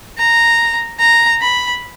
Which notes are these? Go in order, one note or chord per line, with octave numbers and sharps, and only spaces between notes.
A#5
A#5
B5